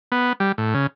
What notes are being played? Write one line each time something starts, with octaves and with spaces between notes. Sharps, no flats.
B3
G3
A2
C#3